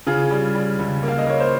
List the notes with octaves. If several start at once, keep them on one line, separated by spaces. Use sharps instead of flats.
C#3 F4 G#4
G3
G3
C#2
A#3
F5
D#5
A#3 C#5
C5